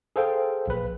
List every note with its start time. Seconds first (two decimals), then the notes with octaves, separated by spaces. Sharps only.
0.16 G#4 A4 C5 F5 G5
0.68 A#1 B4